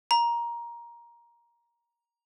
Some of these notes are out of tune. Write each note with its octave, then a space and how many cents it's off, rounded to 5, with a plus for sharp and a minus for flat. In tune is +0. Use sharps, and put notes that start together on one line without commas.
A#5 +15